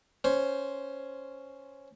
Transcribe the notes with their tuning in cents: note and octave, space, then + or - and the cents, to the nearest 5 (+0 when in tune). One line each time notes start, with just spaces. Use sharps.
C#4 +0 C5 +0